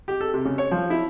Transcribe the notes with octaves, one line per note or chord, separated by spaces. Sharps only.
G4
A4
C3
C#3
C#5
F3
E4